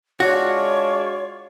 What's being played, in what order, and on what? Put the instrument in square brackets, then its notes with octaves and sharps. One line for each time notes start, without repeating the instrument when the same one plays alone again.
[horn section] G#3 D4 F4 [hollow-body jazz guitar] F#4 [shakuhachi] C#5